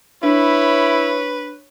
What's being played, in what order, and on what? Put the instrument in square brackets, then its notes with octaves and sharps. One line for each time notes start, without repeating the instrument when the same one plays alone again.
[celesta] D4 [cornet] E4 [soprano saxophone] B4 [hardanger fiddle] C#5